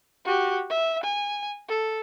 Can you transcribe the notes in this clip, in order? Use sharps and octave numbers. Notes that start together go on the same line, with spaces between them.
F#4 G4
E5
G#5
A4